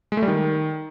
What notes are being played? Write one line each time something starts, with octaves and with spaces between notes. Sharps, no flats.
G#3
A3
G3
D#3